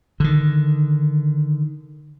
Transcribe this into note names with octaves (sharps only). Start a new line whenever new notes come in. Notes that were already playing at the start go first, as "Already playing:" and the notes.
D3 D#3